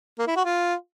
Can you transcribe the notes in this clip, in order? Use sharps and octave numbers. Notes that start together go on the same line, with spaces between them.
A#3
E4
F#4
F4